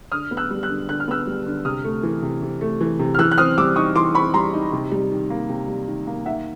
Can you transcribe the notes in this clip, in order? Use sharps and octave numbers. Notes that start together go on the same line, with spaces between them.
D3 D#6 F6
B3
E6 F#6
G3
E6 F#6
D3
D3 F#6
F6
B3 E6 F#6
G3
D3
C3 D#6 F6
A3
E3
C3
C3
A3
E3
C3
F6
E3 E6 F#6
F#6
C4 D#6 F6
G3 D6 E6
D#4 C#6 D#6
E3 C6 D6
C4 B5 C#6
G3 A#5 C6
D#4
C3
G3
D#3
A#3
C3
G3
D#3
A#3
D#3 E5 F#5